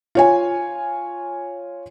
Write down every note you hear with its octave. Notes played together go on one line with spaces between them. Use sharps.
F4 C#5 G#5